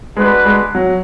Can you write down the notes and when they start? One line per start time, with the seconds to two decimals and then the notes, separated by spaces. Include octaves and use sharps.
0.17 G#3 D4 F#4 B4
0.45 G#3
0.75 F#3